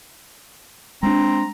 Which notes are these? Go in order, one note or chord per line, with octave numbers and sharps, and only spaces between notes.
G#3 C4 D4 A#5